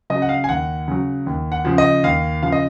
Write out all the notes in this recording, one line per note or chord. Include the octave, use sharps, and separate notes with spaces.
C#3 F#3 D#5
F#5
F5
G#5
D#2 F#5
C#3 F#3
D#2
F#5
C#3 F3
D#5
D#2 F5
C#3 F3 F5
D#5